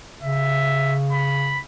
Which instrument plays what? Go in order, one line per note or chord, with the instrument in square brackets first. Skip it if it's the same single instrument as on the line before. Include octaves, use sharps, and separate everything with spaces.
[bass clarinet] C#3 [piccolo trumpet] E5
[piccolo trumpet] B5